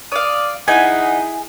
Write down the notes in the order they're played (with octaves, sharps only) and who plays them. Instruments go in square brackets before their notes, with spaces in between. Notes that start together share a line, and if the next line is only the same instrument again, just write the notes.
[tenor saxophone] D5 [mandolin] F5 D#6
[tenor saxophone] D#4 [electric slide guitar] E4 G#4 [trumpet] F#5 [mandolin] G#5